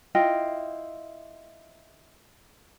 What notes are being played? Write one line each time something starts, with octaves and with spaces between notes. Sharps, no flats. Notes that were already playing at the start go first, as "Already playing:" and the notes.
E4 F4 D#5 G5